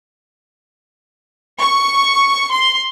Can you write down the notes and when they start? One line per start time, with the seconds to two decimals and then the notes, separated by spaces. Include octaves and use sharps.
1.61 C#6
2.51 C6